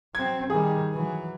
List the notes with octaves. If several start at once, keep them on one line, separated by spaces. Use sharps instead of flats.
F#3 C4 G#6
D#3 G3 G#4
E3 F#3